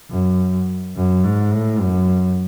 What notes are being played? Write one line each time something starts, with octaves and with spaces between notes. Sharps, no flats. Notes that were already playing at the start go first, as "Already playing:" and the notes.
F#2
F#2
G#2
A2
F#2